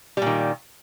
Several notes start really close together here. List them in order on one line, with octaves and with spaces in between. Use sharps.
G3 A#2 D#3